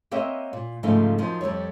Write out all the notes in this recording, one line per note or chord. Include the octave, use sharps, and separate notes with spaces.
A#3 C4 B4 C#5 D#5 E5
A#2
G#2 C#3 F3 A3 D#4
F#2 F3 D#4
F2 G3 C4 C#5